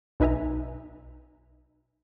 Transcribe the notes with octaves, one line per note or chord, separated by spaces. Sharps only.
B1 D#4 B4 E5 G#5 A#5